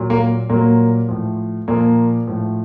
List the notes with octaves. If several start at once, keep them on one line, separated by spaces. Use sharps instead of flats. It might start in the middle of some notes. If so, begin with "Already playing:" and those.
Already playing: A#2 F#3
A#3
A#2 F#3 A#3
A2 F3
A#2 F3 A#3
A2 F3